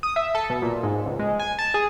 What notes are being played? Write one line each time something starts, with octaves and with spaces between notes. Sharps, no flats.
D#6
E5
A4
B2
A#2
G#2
C#2
G#3
G#5
A5
G#4